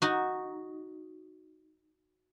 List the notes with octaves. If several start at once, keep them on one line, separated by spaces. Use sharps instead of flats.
D#4 F#4